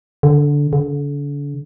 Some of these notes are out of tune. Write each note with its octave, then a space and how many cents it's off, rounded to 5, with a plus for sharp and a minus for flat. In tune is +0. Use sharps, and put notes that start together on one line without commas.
D3 -10
D3 -40